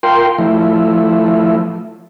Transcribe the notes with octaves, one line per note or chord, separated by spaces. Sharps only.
F4 A#4 G5 C6
F3 A3 E4